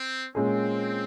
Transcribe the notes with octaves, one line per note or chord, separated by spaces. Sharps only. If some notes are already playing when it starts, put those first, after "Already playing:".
Already playing: C4
A#2 G#3 C4 C#4 G#4